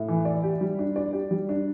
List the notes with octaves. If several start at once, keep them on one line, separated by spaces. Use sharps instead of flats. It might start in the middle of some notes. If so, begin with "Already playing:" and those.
Already playing: A2
E3
D5
G4
G3
D4
D5
G4
G3
D4